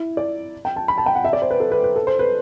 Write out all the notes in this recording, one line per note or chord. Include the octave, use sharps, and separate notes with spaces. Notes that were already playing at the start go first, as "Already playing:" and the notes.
Already playing: E4
D5
G5
A5
B5
A5
G5
F#5
E5
D5
C5
B4
A4
B4
B4
A4
C5
B4